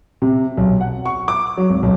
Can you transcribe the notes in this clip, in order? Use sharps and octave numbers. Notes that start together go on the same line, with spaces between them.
C3
B1
F#5
C#6
D6
F#3
G#1
B1